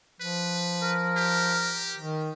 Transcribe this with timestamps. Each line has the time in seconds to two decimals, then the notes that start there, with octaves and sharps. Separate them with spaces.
0.21 F3 B4
0.82 A#4
1.17 G4
1.97 D#3